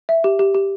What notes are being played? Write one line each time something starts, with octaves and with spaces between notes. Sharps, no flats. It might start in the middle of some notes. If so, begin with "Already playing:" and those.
E5
G4
G4
G4